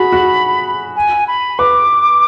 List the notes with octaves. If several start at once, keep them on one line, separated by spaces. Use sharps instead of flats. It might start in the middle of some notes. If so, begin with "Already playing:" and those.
Already playing: F#4 G#4 B5
F#4
G#5
B5
B4 D6